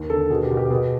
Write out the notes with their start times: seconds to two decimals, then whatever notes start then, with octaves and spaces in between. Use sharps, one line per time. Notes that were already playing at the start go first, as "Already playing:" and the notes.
Already playing: D#2
0.10 D3 A4
0.30 B2 G#4
0.43 G4
0.51 B2
0.57 G4
0.70 B2 G#4